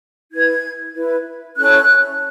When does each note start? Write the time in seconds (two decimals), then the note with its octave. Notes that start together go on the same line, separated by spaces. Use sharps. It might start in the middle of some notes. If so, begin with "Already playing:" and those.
0.32 E4 B4 G#6
0.95 E4 B4
1.56 C#4 E4 A4 C#5 F#6